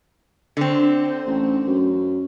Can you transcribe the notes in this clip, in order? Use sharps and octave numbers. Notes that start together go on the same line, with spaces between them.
D3 C4
A1
F#2